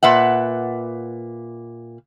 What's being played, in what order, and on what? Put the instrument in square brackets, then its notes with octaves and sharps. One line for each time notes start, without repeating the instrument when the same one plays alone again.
[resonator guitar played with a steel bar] A#2 B4 E5 F#5